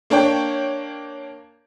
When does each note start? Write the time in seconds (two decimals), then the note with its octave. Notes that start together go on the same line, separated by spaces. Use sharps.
0.10 A#3 D4 C#5 G5